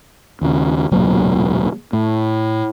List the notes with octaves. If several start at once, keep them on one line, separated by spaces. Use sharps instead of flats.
D#2 C#3
E1 C#2 A#2 F#3
A2